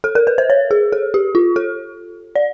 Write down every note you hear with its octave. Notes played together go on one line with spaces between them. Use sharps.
A4
A#4
B4
C5
C#5
G#4
A4
G4
F4
A4
D5